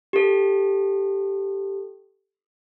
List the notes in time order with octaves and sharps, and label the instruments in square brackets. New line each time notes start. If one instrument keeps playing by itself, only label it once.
[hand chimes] G4 A4